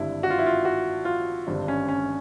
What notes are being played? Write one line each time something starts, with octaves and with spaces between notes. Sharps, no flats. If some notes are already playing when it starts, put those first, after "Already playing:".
Already playing: G#1 G2 D3 E4
F#4
F4
E4
F4
F#4
F4
G#1 G2 D3
C#4
C#4